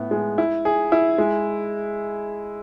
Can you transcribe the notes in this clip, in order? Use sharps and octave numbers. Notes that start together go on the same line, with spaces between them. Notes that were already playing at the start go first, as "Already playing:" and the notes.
Already playing: A2 B3
G#3
E4
G#4
E4
G#3